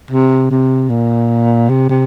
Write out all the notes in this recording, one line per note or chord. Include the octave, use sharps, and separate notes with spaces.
C3
C3
A#2
C3
C3